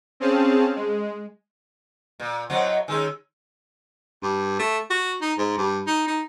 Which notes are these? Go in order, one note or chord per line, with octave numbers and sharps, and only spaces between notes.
C4 C#4 G#4 F5 A5
G#3
A#2
A2 F#3 C4 D#5 F#5
D#3 G#3 C#4 G#5 E6
G2
A3
F#4
D#4
G#2
G2
D#4
D#4